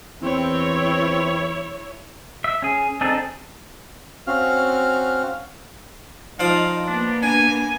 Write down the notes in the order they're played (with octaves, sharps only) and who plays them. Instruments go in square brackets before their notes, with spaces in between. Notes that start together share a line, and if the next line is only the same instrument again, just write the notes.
[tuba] E2 [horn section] C4 [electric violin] E4 C#5
[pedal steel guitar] E5
C#4 G#4
C4 D4 D#4 G#4 A4
[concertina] C4 C#4 F#4 F5 F6
[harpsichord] F3 D5 D#6 [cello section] D#4 [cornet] F5
[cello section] A#3 B3 [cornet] D4
[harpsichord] D4 [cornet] G#5